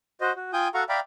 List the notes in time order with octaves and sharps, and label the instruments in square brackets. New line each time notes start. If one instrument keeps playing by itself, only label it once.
[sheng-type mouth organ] F#4 C5 D#5
F#4
F4 G5 G#5 D#6 G6
F#4 A4 F5 F#5 A#5 C#6
D5 E5 F5 G5 A#5 B5